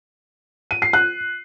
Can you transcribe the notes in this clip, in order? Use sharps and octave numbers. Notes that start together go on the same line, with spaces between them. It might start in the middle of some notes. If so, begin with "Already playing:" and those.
D#7
C7
F#6